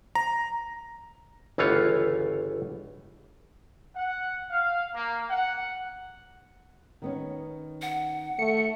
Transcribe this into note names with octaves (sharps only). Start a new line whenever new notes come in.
A#5
G1 C#2 E3 A3 F4 C#5
F#5
F5
A#3
F#5
D#3 B3 C#4
F#5
A3 C#7